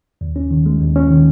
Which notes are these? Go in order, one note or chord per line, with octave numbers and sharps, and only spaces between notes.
D#2
C#4
D#3
G#3
D#2
C#4
D#3